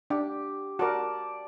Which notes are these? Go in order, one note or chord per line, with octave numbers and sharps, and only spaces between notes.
D4 G4
F#4 A#4 D5 A5